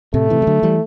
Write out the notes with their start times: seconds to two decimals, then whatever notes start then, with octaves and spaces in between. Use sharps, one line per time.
0.14 A2 C3 A3
0.30 C3 E3
0.42 G3
0.47 D3 F#3
0.63 E3 G3